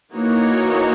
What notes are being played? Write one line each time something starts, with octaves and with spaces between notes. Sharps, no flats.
E3 A#3 D#4 F#4 C#5